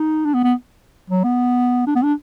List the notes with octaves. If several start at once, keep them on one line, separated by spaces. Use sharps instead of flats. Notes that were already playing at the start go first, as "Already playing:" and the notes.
Already playing: D#4
D4
B3
B3
F#3
B3
D4
B3
D4